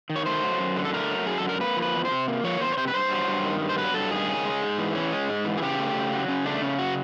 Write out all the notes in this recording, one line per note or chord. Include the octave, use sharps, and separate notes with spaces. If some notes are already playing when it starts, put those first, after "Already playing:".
D#3
C#5
A3 C5
F#3
F#2
D3
A4
A3 A#4
F#3
F#2 G#4
A4
D3
A#4
A#3 B4
F3
B4
E2
C5
C3
A#3
F3 C#5
E2 C5
C#5
C3 C5
B4
G2 C5
F#3
G2
D#3
G2
C5
F#3 B4
G2 A4
D#3 G#4
C#4
G#3
G#2
E3
C#4
G#3
G#2
E3
G#4
C#3 G4
A3
C#3
F#3
C#3 C#4
A3 D4
C#3 C#4
F#3 F#4